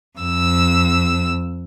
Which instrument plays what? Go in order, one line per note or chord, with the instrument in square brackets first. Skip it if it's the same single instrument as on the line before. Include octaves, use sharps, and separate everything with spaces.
[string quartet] F2 E6